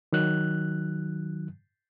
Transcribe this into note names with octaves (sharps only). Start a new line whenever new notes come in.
D#3 F#3 F#6